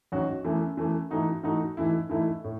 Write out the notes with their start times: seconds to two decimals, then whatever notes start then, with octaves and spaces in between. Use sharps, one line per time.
0.12 A1 G#2 F#3 C#4 F#4
0.44 F#2 E3 A3
0.77 F#2 E3 A3
1.10 G#2 E3 A3 D#4 F#4
1.43 G#2 E3 A3 D#4 F#4
1.77 G#2 E3 A3 E4
2.09 G#2 E3 A3 E4
2.44 A2